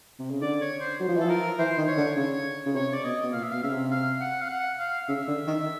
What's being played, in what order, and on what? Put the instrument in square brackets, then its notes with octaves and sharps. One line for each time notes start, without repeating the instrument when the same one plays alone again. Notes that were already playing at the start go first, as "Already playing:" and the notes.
[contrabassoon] C3
C#3
[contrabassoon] D3 [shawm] D5
[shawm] C#5
C5
[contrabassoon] F#3
F3
E3
[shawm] A4
[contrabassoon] F3 [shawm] A#4
[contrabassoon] E3 [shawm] C5
[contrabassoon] D#3
[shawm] C#5
[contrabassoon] D3
[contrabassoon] C#3 [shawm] C#5
[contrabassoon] C#3
[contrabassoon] C3 [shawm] C#5
[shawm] D5
[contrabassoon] B2 [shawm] D#5
[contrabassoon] B2
[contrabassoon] A#2 [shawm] F5
[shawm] E5
[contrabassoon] B2 [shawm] F5
[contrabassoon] C#3 [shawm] E5
[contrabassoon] C3
[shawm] F5
F#5
F5
F#5
F5
[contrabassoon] C#3 [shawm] E5
[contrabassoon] D3
D#3